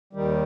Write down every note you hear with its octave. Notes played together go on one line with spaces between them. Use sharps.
D#2 D#3 G3